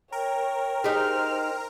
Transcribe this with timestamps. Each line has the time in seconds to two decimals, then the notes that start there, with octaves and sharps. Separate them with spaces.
0.12 A#4 C#5 G5
0.84 D#4 G4 G#4 C5 F6